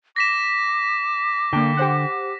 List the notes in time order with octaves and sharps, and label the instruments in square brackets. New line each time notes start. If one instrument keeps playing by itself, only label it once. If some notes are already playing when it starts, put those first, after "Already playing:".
[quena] D6 [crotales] A#6 B6 E7
[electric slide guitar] D3 G5 [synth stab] A#3 D4
[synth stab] G4 C5 F#5